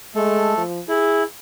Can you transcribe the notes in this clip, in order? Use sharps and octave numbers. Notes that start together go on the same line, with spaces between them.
G#3 A3 A4
F3
E4 G#4